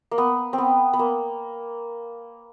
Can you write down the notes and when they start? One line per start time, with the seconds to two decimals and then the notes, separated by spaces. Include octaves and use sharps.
0.11 A#3
0.18 B3
0.53 C4
0.58 B3
0.93 B3
0.99 A#3